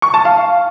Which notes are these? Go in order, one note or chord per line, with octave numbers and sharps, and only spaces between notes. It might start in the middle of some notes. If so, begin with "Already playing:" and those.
C#6
A5
F5